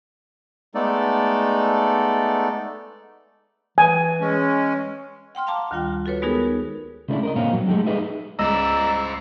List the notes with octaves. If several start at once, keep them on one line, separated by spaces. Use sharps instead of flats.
G#3 A3 B3 D#4 A4 D5
E3 G#5
G#3 C#4
F#5 G5 C6 F6
F5 G5 A5 A#5 D6
D2 D#3 G3 F4 G5
F#4 A4 B4 C#5
G#3 B3 D#4 F#4 G#4 A#4
C#2 C#3 A3 D4 E4 D5
A#4 B4 D#5
A#2 D3 C4 D#4 C#5 F5
F#3
G#3 A3 D#4 G4 A4
D#4 G#4 B4 D#5 E5
C#2 C5 D5 D#5 A#5 E6